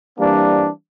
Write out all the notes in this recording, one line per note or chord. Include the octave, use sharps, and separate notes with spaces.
E3 G3 A#3 C4 D4